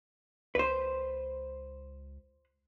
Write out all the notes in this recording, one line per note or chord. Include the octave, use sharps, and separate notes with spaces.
C#2 B4 C5